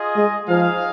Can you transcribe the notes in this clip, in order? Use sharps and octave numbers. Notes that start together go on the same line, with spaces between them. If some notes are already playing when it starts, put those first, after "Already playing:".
Already playing: F4 G#4 D#5
G#3
F3 D#4 G#4 F5